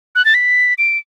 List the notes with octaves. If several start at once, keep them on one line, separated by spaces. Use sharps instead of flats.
F#6
A6
B6
D7